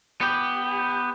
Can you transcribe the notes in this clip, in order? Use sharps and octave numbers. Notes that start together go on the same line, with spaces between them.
B3 G4